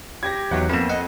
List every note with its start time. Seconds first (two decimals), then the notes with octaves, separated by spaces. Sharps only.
0.23 G4 G#6 A#6
0.51 E2 F#3 D#4 F#5
0.69 F2 A#3 B3 E7
0.90 D#5 F#5